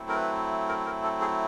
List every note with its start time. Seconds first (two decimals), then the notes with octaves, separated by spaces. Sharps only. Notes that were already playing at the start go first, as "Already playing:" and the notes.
Already playing: F#3 A3 C4 E4
0.09 A#4
0.16 B4
0.68 A#4
0.86 A#4
1.03 A4
1.21 G#4